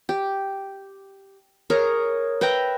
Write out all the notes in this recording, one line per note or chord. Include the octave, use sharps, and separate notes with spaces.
G4
G#4 A#4 C#5
B4 E5 G5 A#5